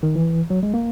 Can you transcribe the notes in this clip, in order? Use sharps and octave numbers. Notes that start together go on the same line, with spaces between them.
D#3
E3
F#3
G#3
A#3